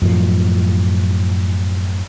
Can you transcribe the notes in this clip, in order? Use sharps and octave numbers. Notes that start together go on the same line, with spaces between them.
F#2 A2 F3